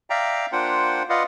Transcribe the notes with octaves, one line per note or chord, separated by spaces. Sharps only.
D5 E5 F5 G5 A#5
A#3 D4 F4 C5 F#5 G5
F4 B4 D5 D#5 F5 F#5